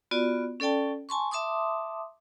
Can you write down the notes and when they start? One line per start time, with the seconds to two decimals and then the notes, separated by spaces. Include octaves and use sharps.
0.11 B3 F4 F#4 D5
0.60 C#4 A4 D5 G5 A5
1.09 G#5 A5 C6 C#6
1.31 E5 A5 C6 D6 D#6